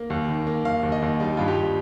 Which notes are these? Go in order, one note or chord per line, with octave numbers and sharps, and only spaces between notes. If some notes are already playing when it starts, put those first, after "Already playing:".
Already playing: A#3
D#2
D#3
A#3
D#2 F5
D#2
D#5
D#2
G3 D#4
G2 F4
G4
G2